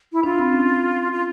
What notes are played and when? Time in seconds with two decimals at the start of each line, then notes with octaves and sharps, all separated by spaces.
0.12 E4
0.23 D4 F4
0.39 C4
0.53 C#4
1.12 F4